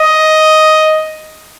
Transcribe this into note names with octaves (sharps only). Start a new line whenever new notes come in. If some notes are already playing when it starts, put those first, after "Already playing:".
Already playing: D#5